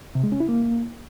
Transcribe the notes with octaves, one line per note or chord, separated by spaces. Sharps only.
C3
G#3
C#4
E4
A#3